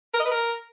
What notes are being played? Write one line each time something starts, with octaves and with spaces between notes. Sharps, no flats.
A#4
D#5
B4
A#4